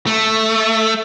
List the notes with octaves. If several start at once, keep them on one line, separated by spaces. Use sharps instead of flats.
A3